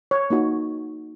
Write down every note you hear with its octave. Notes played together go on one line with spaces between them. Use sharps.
C#5
A#3 D#4 F#4